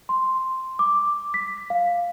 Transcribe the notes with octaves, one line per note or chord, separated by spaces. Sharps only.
C6
D6
B6
F5